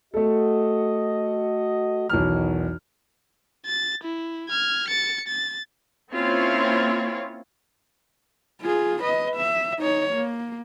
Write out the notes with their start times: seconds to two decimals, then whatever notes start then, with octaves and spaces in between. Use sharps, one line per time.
0.14 A3 F#4 A4 D#5
2.09 B1 E2 D#3 F6
3.66 A6
4.04 E4
4.49 F6 G#6
4.88 A6 C#7
5.28 A6
6.12 A#3 C4 C#4 E4 F4 C#5
8.61 F4 G#4
9.03 B4 D#5
9.36 E5
9.79 D#4 C#5
10.13 A#3